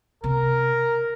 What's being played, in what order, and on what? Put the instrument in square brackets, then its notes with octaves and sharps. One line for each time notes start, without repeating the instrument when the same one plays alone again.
[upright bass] C3 [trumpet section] A#4